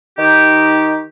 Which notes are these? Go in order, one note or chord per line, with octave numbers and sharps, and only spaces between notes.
D#3 D#4 G4